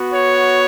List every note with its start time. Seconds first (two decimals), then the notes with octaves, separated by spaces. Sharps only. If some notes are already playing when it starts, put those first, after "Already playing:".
Already playing: B3 F#4
0.13 C#5